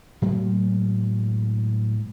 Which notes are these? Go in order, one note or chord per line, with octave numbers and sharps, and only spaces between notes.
A2 F#3 G#3 A#3